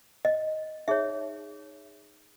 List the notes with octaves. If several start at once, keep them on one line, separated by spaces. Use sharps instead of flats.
D#5
D#4 G#4 C#5 E5